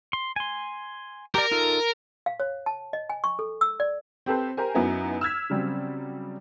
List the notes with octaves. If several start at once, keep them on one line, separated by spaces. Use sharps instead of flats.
C6
G#5 C6
G4 A#4 D5
D#4 F4 A4
F5
C#5
A5
D#5
G#5
C#6
A4
E6
D5
C4 G4 A4 B4 C5
G4 A#4 C5 G#5
F#2 B3 D#4 E4
E6 F6 G#6 B6
C#3 F#3 G3 C4